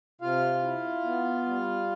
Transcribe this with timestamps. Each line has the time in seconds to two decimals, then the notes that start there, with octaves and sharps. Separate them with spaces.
0.21 C3 F4 F5
0.63 E4
1.04 B3
1.46 G3